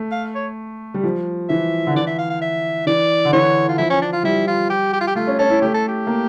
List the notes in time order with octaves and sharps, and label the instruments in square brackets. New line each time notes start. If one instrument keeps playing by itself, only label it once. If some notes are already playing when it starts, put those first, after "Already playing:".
Already playing: [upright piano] A3
[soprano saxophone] F5
C#5
[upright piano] G3
F3
[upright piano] E3 [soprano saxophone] E5
[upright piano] D3
[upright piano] E3 [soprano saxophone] D5
[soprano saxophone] E5
F5
F5
E5
[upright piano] E3 [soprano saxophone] D5
[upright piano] D3
[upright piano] E3 [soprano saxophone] C#5
[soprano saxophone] F4
[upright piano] F3 [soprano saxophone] E4
[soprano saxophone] C#4
D4
F4
[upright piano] G3 [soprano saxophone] E4
[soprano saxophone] F4
G4
G4
F4
G4
[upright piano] A3 [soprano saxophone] F4
[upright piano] C#4
[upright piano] C#4 [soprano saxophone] A4
[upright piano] E4
[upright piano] A3 [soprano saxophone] G4
[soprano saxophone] A4
G4
[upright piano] A#3